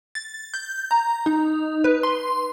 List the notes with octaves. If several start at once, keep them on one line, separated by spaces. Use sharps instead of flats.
A6
G6
A#5
D#4
B4
C6